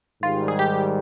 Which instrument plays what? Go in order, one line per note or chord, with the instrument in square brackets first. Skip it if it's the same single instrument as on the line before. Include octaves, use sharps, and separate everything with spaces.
[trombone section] G#2 D#3 G3 [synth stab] F4
[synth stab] G#4
G4